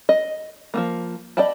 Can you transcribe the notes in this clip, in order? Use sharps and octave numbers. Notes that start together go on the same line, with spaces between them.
D#5
F3 G3 A#3
D5 D#5 G5 A5 B5